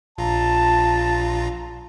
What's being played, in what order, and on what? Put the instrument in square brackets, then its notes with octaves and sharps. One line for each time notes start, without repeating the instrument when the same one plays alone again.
[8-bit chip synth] A#1 F4 A#5 [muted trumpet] A5